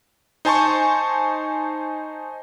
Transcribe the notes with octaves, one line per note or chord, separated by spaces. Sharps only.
D#4 C5 G#5 A5 C6 C#6